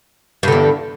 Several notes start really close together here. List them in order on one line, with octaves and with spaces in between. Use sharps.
G2 D3 E2